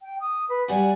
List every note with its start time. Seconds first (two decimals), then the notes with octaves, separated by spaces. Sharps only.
0.01 G5
0.20 D#6
0.49 B4
0.68 G3 F#4 G#5